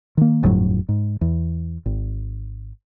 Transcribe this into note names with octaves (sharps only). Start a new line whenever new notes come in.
D#3 A#3
G1 F2 A2 F#3
G#2
E2
G#1